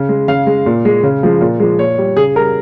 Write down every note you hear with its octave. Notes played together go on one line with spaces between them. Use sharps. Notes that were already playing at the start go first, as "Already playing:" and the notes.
Already playing: C#3
G#3
C#3 F5
G#3
A#2
G#3
C#3
F3 G#3
A#2
F3 G#3
A#2 C#5
G3
C#3 G#4
G3 A#4